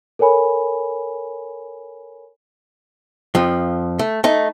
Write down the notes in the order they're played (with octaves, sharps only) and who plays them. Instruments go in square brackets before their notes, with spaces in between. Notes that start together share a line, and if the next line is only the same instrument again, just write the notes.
[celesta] A4 A#4 C#5 G#5 B5
[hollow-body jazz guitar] F2 F3
A3
A3 D#4